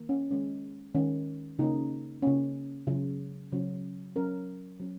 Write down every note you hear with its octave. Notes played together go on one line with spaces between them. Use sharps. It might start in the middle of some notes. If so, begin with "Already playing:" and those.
Already playing: D#3 A#3
C#4
D#3 G#3 C#4
D#3 G#3 C#4
C#3 A#3 C#4 D#4
C#3 A#3 C#4
C#3 F#3 C#4
C#3 F#3 C#4
F#3 C#4 A#4
F#3 C#4